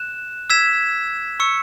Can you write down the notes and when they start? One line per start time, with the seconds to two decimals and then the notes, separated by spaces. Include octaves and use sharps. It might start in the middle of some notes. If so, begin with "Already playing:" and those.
Already playing: F#6 E7
0.50 E6 G#6 B6 E7
1.40 C#6 E6 C#7